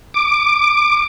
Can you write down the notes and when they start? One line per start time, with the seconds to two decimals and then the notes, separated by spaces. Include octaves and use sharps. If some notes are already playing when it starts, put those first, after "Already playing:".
0.14 D6